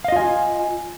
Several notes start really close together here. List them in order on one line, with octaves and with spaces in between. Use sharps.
F5 D#5 F4 G#5